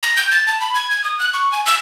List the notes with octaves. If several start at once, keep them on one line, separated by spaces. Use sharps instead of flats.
A#6
G6
A6
A5
B5
G#6
G#6
D#6
F#6
C#6
G#5
E6